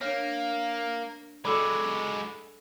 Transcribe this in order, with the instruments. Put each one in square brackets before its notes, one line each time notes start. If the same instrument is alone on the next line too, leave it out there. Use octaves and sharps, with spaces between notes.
[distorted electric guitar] A#3 [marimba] D4 F6 [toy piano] C#5 E5 F#5
[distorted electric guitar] G#3 F#4 [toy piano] A4 D5 [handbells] B5 D6 E6